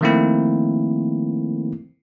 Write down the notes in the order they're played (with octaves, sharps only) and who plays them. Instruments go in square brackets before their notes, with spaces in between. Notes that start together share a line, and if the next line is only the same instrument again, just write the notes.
[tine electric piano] D#3 F3 A3 A#3 C4 E4